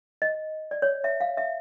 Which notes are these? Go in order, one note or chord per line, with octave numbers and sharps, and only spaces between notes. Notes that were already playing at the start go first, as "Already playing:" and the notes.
D#5
D5
C#5
E5
F5
E5